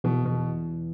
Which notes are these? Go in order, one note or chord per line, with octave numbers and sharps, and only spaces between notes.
E2 B2
B2